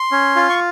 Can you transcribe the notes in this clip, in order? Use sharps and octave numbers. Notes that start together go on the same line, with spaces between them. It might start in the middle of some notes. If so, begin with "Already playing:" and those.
Already playing: C6
C#4
F4
C#6